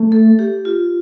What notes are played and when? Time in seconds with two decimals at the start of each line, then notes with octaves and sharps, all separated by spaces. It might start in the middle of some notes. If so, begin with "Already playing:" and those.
Already playing: A3
0.12 A4
0.39 G4
0.65 F4